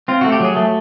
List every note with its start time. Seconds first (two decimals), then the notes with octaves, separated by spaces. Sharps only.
0.08 C4 F4
0.21 A3 F#4
0.32 G4
0.40 F#3 G#4
0.56 A3